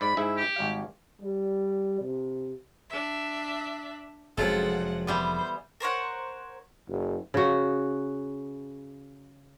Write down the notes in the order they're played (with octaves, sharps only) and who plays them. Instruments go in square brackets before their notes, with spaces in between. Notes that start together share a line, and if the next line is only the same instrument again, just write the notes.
[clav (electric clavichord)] G#2 D5 [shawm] B5
[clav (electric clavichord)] G#2 E4 G#4 [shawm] E5
[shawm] G4
[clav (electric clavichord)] G#1 G3 F5
[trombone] G3
C3
[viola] D4 E5
[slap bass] F1 [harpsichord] C#3 F#3 C4 [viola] G#3 F#5 [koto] F4 A4
[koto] E3 G3 B3 [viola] C5
[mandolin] A#4 C5 C#5 F#5
[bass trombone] F#1
[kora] C#3 F#4